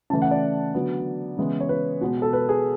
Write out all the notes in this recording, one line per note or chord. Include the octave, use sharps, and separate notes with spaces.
C#3 E3 A3 A5
F#5
D5
D3 F#3 B3
C#3 E3 G#3 B3
C#5
B4
B2 G#3 B3
A4
B4
G#4